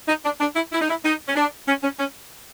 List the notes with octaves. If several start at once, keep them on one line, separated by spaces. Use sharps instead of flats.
D#4
D4
D4
E4
E4
D#4
E4
D#4
C#4
D4
C#4
C#4
C#4